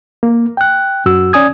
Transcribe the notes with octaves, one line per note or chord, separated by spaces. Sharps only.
A#3
G5 F#6
F#2 F#4 E6
C#4 D5 G#5 D#6 G#6